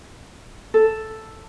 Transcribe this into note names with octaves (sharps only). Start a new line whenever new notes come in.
A4